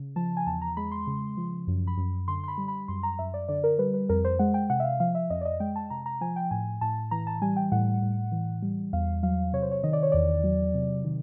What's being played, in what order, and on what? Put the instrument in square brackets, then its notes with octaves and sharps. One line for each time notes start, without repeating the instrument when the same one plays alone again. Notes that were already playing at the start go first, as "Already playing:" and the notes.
Already playing: [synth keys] C#3
F3 A5
G#5
E2 A5
A#5
G#3 B5
C6
C#3
F3
F#2
B5
F#2
D3 C6
C6
B5
G3
B5
F#2 C6
A#5
F#2 E5
D5
D3 D5
A#4
G3 B4
B4
F2 A#4
C5
G#3 F#5
G5
C3 F#5
E5
F5
F3 F5
E5
F2 D#5
D5
D#5
G#3 G5
A5
C3 A#5
A#5
F3 G#5
G5
A2 G#5
A2 A5
E3 A#5
A5
G3 G#5
G5
A2 F#5
A2
E3
G3
E2 F5
F#3 F5
C3 C#5
C5
C#5
D#3 D#5
D5
C#5
E2 D5
F#3
C3
D#3